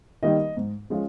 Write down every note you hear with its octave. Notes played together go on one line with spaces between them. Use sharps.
D#3 G3 A#3 D#4 D#5
G#2
F3 G#3 C#4 F4